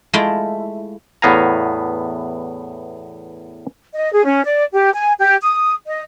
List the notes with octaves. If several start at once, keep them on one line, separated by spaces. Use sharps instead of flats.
G#3 A3 E4 F4 E5 G5
E2 A2 B3 F5 G#5 A#5
D#5
G#4
C#4
D5
G4
G#5
G4
D#6
D#5